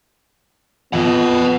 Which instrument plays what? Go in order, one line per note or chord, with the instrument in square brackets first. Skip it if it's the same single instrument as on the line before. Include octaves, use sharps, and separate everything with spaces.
[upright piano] F2 [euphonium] B3 [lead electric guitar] D#5 F#5